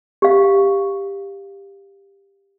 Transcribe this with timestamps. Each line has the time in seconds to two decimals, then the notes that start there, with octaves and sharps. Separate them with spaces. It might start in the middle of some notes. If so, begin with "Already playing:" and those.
0.22 G4 F5